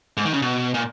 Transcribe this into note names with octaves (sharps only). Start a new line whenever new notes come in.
G#2
D#3
C#3
B2
A#2